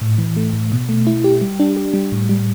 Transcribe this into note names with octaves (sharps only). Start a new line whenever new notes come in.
A2
E3
A3
A2
B2
A3
E4
G4
G3
D4
G4
G3
A2
G3